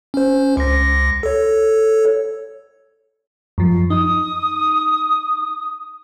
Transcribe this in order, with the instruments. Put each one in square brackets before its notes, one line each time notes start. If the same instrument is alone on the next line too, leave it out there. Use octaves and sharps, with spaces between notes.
[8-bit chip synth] C#4 C5
C#2 A#6
A4 C#5
[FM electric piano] F#2 F3
[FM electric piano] D#4 [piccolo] D#6